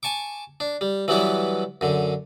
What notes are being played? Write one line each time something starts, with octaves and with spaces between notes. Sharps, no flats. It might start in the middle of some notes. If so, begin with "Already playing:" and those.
G#5 A5 C#6 D6
D4
G3
E3 F#3 G3 B3 E4
F#2 D3